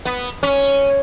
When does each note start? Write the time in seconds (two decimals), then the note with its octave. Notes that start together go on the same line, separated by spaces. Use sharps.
0.05 B3
0.43 C#4